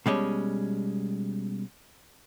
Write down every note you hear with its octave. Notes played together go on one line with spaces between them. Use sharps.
B2 G3 G#3 C#4